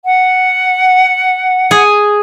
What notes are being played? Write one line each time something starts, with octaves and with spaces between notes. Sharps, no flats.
F#5
G#4